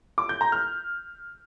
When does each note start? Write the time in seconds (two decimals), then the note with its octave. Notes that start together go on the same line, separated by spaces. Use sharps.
0.18 D6
0.29 G6
0.41 A#5
0.52 F6